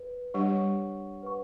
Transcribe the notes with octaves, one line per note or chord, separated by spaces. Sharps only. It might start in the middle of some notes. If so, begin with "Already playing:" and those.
Already playing: B4
G3 D4 G4 C#5 F#5 C#6
B4 F#5 C#6